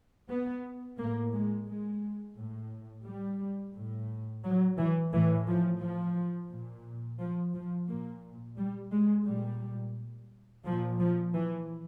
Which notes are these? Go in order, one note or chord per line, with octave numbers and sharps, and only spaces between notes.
B3
A2 A#3
G#3
G#3
A2
G3
A2
F#3
E3
A2 E3
F3
F3
A#2
F3
F3
A#2 A#3
G3
G#3
A#2 G3
A#2 F3
F3
E3